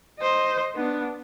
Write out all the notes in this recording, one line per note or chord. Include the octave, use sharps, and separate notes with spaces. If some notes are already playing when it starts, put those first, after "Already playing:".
C5 D#5
B3 D4